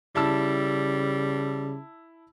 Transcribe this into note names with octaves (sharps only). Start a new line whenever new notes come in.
C#3 G3 E4 A5 E6